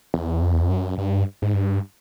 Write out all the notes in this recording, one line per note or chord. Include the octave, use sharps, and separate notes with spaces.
E2
F2
E2
F2
F#2
G2
G#2
G2